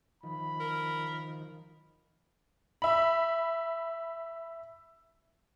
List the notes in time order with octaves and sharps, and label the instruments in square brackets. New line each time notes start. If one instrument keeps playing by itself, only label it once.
[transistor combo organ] D#3 F3 [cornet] B5
[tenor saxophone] A#4
[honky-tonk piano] E5 B5